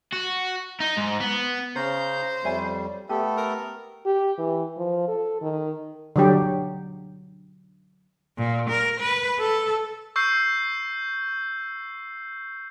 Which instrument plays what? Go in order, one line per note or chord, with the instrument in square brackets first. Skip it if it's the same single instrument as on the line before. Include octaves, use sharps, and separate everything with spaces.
[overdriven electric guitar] F#4
D#4
G#2
B3
[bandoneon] C#3 A#5 G6 [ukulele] C#4 [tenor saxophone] C5
[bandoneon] F2 G3 [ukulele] C#5 E5 G#5
[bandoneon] A3 B3 A4 [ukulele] G4
[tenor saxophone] A#4
[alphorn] G4
E3
F3
A4
D#3
[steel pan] D3 F#3 G4
[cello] A#2
A#4
B4
A4
[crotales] C#6 E6 G6 C7